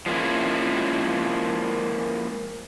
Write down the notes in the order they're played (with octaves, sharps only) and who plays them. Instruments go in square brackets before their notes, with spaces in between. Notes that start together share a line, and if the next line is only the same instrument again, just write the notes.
[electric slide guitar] F3 G#3 A#3 C#4 E4